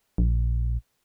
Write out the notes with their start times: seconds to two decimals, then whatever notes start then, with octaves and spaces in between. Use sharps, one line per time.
0.18 A#1